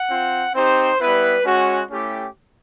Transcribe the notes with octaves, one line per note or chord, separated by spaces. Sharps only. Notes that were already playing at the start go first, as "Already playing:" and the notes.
Already playing: F#5
C4 F4
C4 D#4 G4 C5
G3 B3 E4 B4
G#3 C#4 F#4
A3 C#4 E4 G4